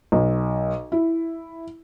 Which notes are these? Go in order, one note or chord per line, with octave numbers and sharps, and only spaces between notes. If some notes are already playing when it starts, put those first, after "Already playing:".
B1
E4